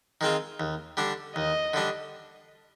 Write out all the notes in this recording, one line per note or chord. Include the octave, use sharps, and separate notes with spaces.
D#3 G#3 C4 F4
D#2
D3 G3 D4
D#2 D#5
D3 G3 D4